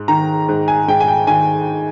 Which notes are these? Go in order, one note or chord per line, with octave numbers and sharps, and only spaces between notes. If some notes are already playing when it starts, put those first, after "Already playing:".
Already playing: G#2
D#3 A#5
G#2
G#5
G#2 G5
G#5
G5
D#3 G#5